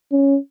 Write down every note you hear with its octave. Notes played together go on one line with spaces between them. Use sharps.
C#4